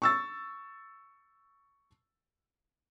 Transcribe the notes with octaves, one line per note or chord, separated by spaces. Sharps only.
C#6 E6 A6